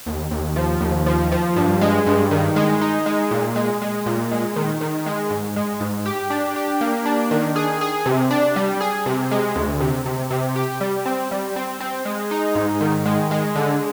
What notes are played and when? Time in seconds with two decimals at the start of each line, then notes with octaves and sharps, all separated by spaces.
0.06 D#2
0.31 D#2
0.56 F3
0.81 D#2
1.06 F3
1.32 F3
1.56 G2
1.81 G#3
2.06 G2
2.31 D#3
2.56 G#3
2.81 D#4
3.06 G#3
3.31 A#2
3.56 G#3
3.82 G#3
4.06 A#2
4.31 G#3
4.56 D#3
4.81 D#3
5.06 G#3
5.30 G#2
5.56 G#3
5.80 G#2
6.06 G4
6.30 D4
6.56 G4
6.81 A#3
7.06 D4
7.31 D#3
7.56 G#4
7.81 G#4
8.06 C3
8.31 D4
8.56 G3
8.81 G#4
9.06 C3
9.31 G#3
9.56 D2
9.80 C3
10.06 C3
10.31 C3
10.56 G4
10.81 G3
11.06 C4
11.31 G3
11.56 C4
11.80 C4
12.05 G#3
12.31 D#4
12.55 G#2
12.81 D#3
13.06 G#3
13.31 G#3
13.55 D3